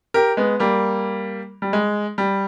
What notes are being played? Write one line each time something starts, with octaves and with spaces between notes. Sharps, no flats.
G4 A#4
G#3 B3
G3 A#3
G3
G#3
G3